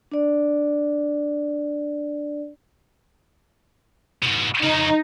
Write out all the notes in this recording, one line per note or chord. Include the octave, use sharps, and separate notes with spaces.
D4 D5
G#2 B2
F2 C#3 D#4